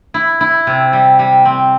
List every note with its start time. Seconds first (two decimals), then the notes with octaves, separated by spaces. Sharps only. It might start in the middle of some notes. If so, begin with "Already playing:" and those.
0.14 E4
0.41 E4
0.67 C3
0.93 G3
1.19 G3
1.45 C4